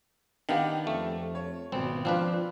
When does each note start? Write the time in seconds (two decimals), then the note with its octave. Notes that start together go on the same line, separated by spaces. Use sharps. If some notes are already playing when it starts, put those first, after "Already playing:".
0.49 D#3 B3 D4 G4 F5
0.87 F2 A3
1.35 C#5
1.72 G#1 B2 C4
2.05 F3 C4 D4 B4 F5